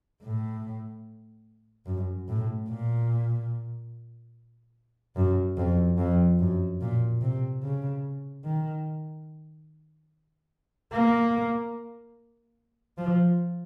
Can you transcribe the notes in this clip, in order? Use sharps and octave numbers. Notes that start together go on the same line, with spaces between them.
A2
F#2
A2
A#2
F#2
F2
F2
F#2
A#2
C3
C#3
D#3
A#3
F3